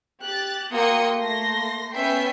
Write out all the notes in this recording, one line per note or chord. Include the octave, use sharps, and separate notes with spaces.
G4 F#6 A6
A#3 F#4 G5 C6 D#6 C#7
A3 A#3 C6 A#6
B3 C#4 E5 G5 G6 C7